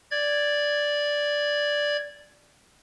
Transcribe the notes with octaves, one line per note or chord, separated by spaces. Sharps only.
D5 G#6